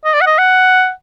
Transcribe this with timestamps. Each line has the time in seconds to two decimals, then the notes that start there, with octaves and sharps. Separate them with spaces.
0.05 D#5
0.14 D5
0.21 F#5
0.26 D#5
0.38 F#5